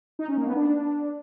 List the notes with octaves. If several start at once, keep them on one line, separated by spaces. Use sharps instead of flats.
D#4
C#4
A#3
B3
D4